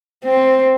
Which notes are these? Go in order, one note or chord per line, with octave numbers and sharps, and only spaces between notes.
C4